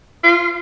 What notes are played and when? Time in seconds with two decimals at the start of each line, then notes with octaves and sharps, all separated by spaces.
0.24 F4